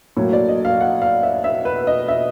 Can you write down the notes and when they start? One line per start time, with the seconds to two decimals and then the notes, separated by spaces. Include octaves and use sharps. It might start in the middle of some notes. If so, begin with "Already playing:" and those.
0.16 A2 F#3 A#3 C#5
0.33 D5
0.49 D#5
0.65 F5
0.81 F#5
1.02 F5
1.23 E5
1.44 E5
1.65 B4
1.87 D#5
2.08 E5